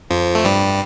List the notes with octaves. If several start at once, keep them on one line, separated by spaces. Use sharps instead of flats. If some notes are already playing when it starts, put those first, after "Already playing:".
F2 F3
A3
G2 G3